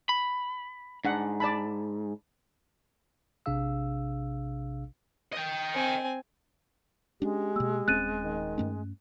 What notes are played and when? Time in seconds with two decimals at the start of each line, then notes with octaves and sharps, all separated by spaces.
0.09 B5
1.05 G#2 D4 F#5
1.40 D5 A5 B5
3.46 A#1 C3 D4 G#4 F5 E6
5.33 D#5 G5
5.74 C4 G#5
7.22 G#3 C#4 D4 G4
7.56 B2 A#3 E6
7.88 D#1 C4 C#4 F#6 A6 D#7
8.24 D#3
8.58 G2 A3 C#4